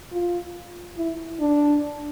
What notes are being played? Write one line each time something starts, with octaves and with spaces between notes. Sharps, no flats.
F4
E4
D4